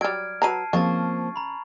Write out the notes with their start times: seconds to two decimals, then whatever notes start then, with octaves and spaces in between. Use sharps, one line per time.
0.01 F#3 G3 F6 G#6 D7
0.42 F#3 B4 A5 A#5 C7 D#7
0.73 C#3 F3 A#3 C4 F4 C#6 A6
1.36 A#5 B5